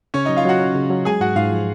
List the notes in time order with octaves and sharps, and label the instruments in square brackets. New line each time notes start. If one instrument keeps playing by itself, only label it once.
[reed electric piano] C#3 [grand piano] C#4 C#5
[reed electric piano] F#3 [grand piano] D#4 D#5
[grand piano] F4 F5
[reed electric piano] F#3 [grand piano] F#4 F#5
[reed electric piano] C#4
C#3
F#3
[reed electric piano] G#3 [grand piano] G#4 G#5
[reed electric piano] G#2 [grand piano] F#4 F#5
[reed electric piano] G#2 [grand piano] F4 F5
[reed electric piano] F3